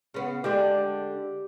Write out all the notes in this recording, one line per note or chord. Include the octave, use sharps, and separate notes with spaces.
C#3 B3
D3 G#3 D4 G4